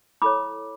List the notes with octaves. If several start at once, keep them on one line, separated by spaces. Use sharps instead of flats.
E4 A4 C#5 B5 D6